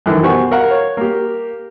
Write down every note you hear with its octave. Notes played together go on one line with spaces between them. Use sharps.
F#2 D#3 E3 A4 A#4
B2 G4 C5 F#5 G#5 C#6
A#4 F5 F#5 A#5
C#5
A#3 G4